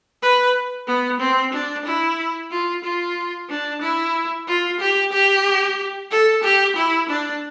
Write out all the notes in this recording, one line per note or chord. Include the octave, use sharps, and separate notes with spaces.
B4
B3
C4
D4
E4
F4
F4
D4
E4
F4
G4
G4
A4
G4
E4
D4